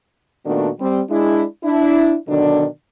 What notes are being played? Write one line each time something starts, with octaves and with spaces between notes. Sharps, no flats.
A#2 D#3 A3 B3 D4 F#4
G3 C4
G#3 D4 E4
D4 E4
B2 D3 D#3 F#3 D4